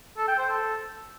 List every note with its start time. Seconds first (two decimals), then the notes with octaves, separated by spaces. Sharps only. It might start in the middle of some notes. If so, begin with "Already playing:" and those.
0.17 A4
0.28 G5
0.38 C5
0.49 A4